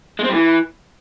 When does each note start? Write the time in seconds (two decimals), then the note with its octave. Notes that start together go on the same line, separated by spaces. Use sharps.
0.19 G#3
0.24 C4
0.29 G3
0.34 E3